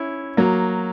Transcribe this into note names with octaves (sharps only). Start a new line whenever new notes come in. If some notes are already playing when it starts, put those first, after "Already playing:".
Already playing: C#4 E4
F#3 A#3